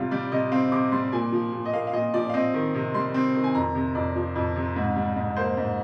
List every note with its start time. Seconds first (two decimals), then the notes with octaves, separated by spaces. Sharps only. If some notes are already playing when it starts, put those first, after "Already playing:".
Already playing: C3 G3 F4
0.11 G3 D5
0.32 C3 D#5
0.52 C4 F5
0.72 C3 D6
0.92 G3 C6
1.12 A#2 G#5
1.32 F3
1.53 A#2
1.65 D#5
1.73 A#3 F5
1.87 F5
1.93 A#2 D#5
2.14 F3 D5
2.29 F5
2.34 C4 D#5
2.54 D#3
2.74 C3
2.94 G3 C6
3.14 C4
3.34 D#3
3.44 G#5
3.54 F2 A#5
3.75 C3
3.95 F2 D5
4.16 F3
4.36 F2
4.56 C3
4.76 G#2
4.96 G3
5.16 G#2
5.36 A#3 C5
5.57 G#2